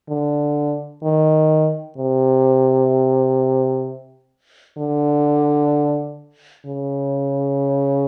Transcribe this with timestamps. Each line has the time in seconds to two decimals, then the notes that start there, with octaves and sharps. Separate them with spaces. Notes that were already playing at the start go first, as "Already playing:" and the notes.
0.09 D3
1.03 D#3
1.98 C3
4.78 D3
6.66 C#3